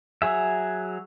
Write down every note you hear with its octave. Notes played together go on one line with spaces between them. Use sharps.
F#3 G#4 E5